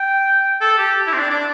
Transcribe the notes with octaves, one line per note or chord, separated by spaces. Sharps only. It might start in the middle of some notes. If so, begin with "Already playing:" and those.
Already playing: G5
A4
G4
E4
C4
D4
D4